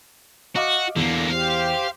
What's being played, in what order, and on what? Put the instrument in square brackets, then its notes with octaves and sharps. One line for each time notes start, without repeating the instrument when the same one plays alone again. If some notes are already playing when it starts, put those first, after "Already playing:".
[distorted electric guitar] F#4 [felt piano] D#5 F5 D6
[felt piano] E2 [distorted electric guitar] D3 A#3
[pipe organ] G4 C5 [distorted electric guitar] F5